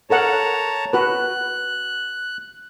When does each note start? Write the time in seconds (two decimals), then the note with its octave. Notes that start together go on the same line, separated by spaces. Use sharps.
0.10 A4 A#4 C#5 F#5 A5 A#5
0.93 F#4 B4 F#6